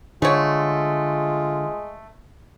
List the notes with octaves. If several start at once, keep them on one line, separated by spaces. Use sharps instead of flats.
D3 G#3 A3 F4 C#5